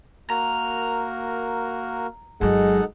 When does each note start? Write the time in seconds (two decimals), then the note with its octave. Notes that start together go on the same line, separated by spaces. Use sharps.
0.30 A#3 F#4 A#4 A#5
2.41 G1 F#3 G#3 D#4 A4 F#5